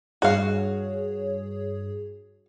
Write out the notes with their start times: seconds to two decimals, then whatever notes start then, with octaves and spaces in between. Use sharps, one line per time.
0.22 G2 F#4 G#4 C#5 F5